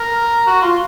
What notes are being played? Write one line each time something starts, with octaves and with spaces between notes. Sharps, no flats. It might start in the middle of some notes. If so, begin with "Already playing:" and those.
Already playing: A#4
F#4
F4